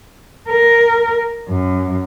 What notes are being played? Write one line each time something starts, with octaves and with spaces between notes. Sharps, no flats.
A#4
F#2